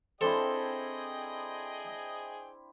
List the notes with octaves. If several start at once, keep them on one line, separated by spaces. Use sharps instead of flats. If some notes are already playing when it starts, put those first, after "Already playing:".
C4 D4 E4 G#4 A4 D#5 G5 C6